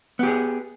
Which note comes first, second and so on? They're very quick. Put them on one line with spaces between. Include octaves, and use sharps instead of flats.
B3 G4 G#4